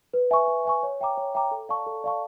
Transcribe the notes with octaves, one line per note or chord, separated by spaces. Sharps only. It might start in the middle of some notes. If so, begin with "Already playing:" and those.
B4
E5 G#5 C#6
B4
E5 G#5 C#6
C#5
E5 G5 A#5 D6
C#5
E5 G5 A#5 D6
A4
D5 F5 A5 C#6
A4
D5 F5 A5 C#6